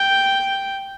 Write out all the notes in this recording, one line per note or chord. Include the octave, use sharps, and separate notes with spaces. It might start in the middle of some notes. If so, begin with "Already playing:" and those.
Already playing: G5